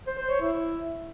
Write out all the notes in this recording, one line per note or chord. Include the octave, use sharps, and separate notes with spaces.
C5
C5
C#5
E4